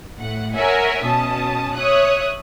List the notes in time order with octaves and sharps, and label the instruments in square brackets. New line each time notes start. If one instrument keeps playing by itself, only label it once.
[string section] A2 F#5
A#4 C#5 E5 F#5 G#5
B2 C#4 A5 D#6
C#5 E5 D#6 F#6